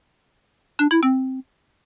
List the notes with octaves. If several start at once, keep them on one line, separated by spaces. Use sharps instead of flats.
D4
E4
C4